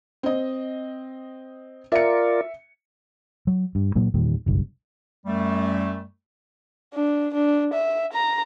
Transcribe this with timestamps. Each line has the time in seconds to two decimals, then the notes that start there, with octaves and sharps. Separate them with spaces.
0.23 C4 D#5
1.92 F4 A#4 D5 E5 C#7
3.47 F#3
3.75 G2
3.95 A#2 F#3 A#3
4.14 E2 A#2 D#3 G3
4.46 F#1 B1 G2
5.25 F#2 G3 A3
6.94 D4
7.34 D4
7.74 E5
8.13 A#5